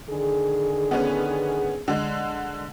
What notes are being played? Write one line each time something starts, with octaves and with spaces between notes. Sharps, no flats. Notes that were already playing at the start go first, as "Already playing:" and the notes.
D3 D#3 G#4
B3 C#4 B4
D3 G#3